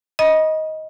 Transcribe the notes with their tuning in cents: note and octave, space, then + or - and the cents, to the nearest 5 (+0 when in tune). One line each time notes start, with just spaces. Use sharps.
D#5 +15 B5 -40 D#6 -10